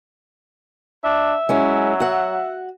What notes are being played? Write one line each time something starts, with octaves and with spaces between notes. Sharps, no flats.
D4 E5
F#3 G#3 C#4 E4
F#4 F#5